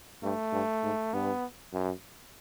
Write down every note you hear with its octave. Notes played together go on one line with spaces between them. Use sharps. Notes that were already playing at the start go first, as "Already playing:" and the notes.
G2 A3
G2
G#2
G2 B3
F#2